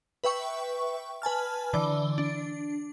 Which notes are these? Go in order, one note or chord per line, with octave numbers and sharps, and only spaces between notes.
B4 E5 G5 C#6
B4 G#5 A5 F6
D3 E3 D5 G7
D4